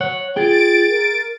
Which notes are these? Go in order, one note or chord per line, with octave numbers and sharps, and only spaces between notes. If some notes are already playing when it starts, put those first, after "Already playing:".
C#5 F#5
F4 G#4 G5 A6 D7
A#4